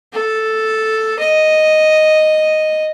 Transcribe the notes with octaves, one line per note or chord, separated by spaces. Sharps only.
A4
D#5